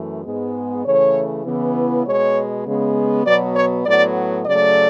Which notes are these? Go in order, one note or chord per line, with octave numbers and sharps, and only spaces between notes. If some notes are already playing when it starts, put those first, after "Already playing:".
Already playing: F#2 E3 A3
G#2 G#3 B3
C#3 E3 A3 C#5
C#3 E3 B3
B2 G#3 B3 C#5
C#3 G#3 B3
B2 F#3 B3 D5
C#5
A2 F#3 B3 D5
C#3 F#3 A3 D5